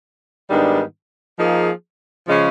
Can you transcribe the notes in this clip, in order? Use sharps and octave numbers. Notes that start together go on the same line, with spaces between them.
G#2 D#3 G3 B3 D4
F3 A#3 D#4 G#4
C#3 F3 G#3 C#4